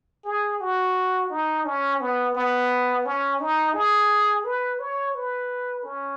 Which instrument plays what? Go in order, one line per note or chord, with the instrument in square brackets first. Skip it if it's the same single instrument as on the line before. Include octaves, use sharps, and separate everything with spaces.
[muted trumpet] G#4
F#4
D#4
C#4
B3
B3
C#4
D#4
G#4
B4
C#5
B4
C#4